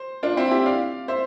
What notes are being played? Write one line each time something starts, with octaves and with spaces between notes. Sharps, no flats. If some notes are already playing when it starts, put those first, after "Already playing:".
Already playing: C5
D4 F4
C4 E4
E4 G4
D5 F5
C5 E5